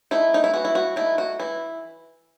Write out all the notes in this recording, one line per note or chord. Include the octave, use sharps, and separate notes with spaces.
A3 D#4 E4
D#4
E4
E3 F#4
E4
F#4
A3 D#4 E4
F#4
E3 E4